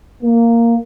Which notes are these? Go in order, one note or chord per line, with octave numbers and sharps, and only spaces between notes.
A#3